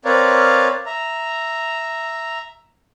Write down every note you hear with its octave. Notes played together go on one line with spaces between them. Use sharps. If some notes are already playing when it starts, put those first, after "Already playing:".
C4 A#4 B4 C#5 D5 F5
E5 A#5